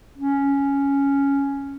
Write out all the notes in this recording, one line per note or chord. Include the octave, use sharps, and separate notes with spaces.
C#4